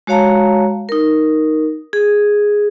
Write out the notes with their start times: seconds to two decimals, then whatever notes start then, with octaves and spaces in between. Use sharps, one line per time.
0.07 G#3 F#4 C#5 F5 A5 A#5
0.89 D#4 A#4
1.93 G#4